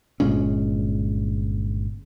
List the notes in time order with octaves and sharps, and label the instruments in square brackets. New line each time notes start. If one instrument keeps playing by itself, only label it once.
[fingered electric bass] G1 A#2 G#3 C#4